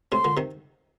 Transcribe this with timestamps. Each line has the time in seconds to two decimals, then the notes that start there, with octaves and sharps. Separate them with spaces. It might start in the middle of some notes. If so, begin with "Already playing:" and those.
0.12 A2 C3 C6
0.24 A#2 D3
0.37 C3 D#3